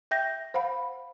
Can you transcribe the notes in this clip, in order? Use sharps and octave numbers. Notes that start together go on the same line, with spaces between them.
E5 G5 G6 A#6
C5 F5 F#5 B5